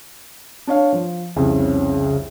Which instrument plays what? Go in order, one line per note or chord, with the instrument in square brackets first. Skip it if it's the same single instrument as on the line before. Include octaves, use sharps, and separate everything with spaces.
[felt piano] D4 C#5 F5
F3
[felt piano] C2 F2 [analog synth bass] C#3